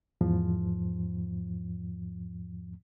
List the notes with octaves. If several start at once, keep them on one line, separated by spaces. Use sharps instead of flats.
E2 G#2 F3